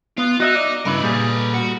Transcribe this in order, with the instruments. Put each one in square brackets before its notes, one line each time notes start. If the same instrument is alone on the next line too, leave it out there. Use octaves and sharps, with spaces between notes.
[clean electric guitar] B3 [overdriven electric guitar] F4
[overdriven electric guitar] D#4 [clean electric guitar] F#4 D#5 E5
[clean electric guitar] D5
[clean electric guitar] G2 C#3 E4 [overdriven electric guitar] A#4 B4
[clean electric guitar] A#2 G3 G#4
[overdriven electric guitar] F#4